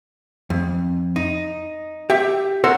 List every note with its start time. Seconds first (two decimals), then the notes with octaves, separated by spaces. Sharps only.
0.50 F2
1.16 D#4
2.10 G4 E5
2.64 A4 A#4 C5 C#5 F#5